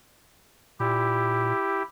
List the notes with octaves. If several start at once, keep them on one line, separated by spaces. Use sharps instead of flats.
A#2 E4 G4